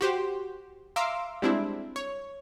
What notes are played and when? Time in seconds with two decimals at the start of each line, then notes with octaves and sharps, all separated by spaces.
0.01 F#4 G4 C5
0.96 E5 F5 A#5 C6 D6 E6
1.42 G3 G#3 C4 D4 E4
1.96 C#5